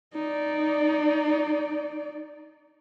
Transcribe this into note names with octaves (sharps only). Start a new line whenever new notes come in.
D#4 D5